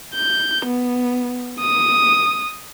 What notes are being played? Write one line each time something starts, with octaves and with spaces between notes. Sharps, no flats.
G6
B3
D#6